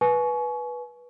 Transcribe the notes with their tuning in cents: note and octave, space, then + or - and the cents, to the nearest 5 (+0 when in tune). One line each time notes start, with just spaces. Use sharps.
B4 -15 G#5 +35 C#6 +15